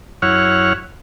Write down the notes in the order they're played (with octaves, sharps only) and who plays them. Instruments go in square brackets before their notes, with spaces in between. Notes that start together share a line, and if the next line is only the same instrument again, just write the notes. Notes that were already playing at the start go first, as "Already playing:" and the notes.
[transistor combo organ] F#2 E4 C#5 F#5 F6